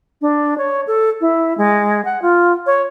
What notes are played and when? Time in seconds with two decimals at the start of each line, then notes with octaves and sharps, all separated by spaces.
0.21 D4
0.58 C#5
0.87 A4
1.21 E4
1.57 G#3
2.05 F#5
2.22 F4
2.66 C#5